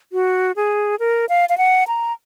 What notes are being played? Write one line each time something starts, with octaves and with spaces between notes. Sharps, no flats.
F#4
G#4
A#4
F5
F5
F#5
A#5